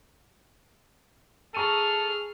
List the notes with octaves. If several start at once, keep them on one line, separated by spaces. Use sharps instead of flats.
G#4 A4 A#5 C#6 F6 D#7